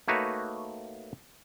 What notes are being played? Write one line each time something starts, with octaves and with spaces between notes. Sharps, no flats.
A3 A#3 D#4 F#4 B4 C#5